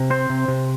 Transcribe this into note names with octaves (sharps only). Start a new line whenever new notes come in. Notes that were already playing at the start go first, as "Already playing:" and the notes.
Already playing: C3
C4 C5
C3
C3